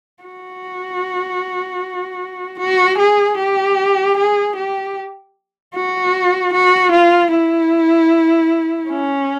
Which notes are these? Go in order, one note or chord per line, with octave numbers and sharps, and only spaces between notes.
F#4
F#4
G#4
G4
G#4
G4
F#4
F#4
F4
E4
C#4